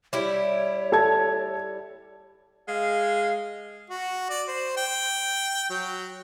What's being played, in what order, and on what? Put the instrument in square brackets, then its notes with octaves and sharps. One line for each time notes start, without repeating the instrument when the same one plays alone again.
[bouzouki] G3 E4 [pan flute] C#5
[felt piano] A4 A5 G#6
[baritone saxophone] G#3 [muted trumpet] F5
[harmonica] F#4
D5
C5
G5
F#3